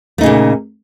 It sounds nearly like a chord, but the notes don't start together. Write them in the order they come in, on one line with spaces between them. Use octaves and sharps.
A3 D#4 C#3 A#2